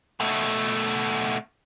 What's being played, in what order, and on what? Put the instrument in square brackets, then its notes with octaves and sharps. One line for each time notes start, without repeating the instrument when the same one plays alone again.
[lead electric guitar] B2 A3